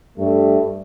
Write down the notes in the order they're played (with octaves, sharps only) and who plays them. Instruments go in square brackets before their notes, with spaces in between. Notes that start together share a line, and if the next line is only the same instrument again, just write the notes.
[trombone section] G2 G3 A3